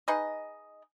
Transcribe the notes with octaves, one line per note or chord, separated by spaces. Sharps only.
D#4 G#4 B4 D#5